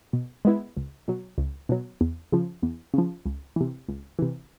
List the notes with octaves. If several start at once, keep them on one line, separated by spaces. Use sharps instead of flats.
B2
G#3 B3 E4
C#2
B2 F#3
C#2
B2 F#3
E2
C#3 F3
E2
C#3 F3
C#2
C3 E3
C#2
C3 E3